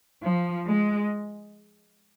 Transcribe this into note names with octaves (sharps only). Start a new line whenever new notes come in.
F3
G#3